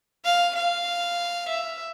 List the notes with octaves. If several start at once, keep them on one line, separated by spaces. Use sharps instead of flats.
F5
F5
E5